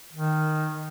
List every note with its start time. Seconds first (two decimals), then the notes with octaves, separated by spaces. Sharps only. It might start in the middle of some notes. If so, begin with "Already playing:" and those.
0.13 D#3